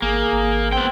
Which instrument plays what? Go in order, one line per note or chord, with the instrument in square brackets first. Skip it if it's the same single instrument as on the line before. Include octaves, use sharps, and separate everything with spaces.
[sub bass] G#1 [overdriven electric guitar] A#3 [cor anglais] G#4
[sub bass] G#1
[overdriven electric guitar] B3 G5 [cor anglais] C4